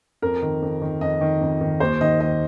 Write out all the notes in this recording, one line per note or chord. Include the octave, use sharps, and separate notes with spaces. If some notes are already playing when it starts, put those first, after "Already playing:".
F2 A#4
D#3
F2
D#3
F2 D#5
D#3
F2
D#3
D#2 C5
D#3 D#5
D#2 D#5